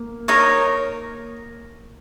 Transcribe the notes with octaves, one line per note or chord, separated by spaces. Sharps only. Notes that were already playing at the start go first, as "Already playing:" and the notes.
Already playing: A#3
D#4 A#4 C#5